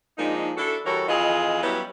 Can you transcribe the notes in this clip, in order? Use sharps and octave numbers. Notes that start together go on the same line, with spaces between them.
F3 G#3 A#3 D4 D#4
D4 E4 F#4 A4
E3 G3 F#4 A4 A#4 C#5
F2 E3 F4 G#4 D#5
F#3 G3 B3 C#4 E4